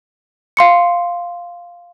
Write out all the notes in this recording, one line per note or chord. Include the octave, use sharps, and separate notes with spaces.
F5 C6 C#7